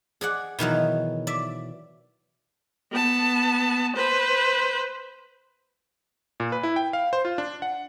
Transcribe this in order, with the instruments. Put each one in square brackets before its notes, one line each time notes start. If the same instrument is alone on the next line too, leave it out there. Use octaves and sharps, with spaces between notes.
[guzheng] G#4 D5 F#5
B2 D#3 E3 F#3
D5 E5
[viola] B3 A5
B4 C5
[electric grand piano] A#2
B4
E4
G5
F5
C5
F4
D4
F#5